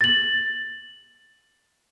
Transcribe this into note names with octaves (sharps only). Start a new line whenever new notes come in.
A6 F#7